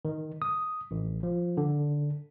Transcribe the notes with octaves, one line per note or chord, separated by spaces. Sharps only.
D#3
D#6
A1
F3
D3